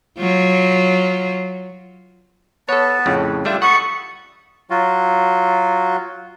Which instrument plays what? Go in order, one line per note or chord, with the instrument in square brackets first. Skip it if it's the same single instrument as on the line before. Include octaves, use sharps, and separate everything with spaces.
[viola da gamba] F#3 F4
[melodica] B3 B4 [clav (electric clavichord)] A4 C#5 [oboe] A5
[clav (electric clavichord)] F2 A2 C#3
[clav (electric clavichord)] G3 A3 E5 [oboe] D4 [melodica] F4 G4
[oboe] A4 [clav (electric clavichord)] F#5 [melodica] B5 D#6 [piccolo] C#6
[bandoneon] F#3 F4 F#4